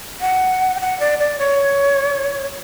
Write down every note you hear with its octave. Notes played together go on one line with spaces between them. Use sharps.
F#5
G5
F#5
D5
D5
C#5